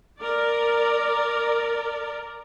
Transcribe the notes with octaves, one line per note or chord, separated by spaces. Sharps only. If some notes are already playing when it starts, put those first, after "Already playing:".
A#4 D5